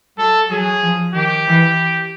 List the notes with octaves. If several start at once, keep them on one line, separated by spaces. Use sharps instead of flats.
F#3 A4
F#3 G#4
F3
D#3 G4
E3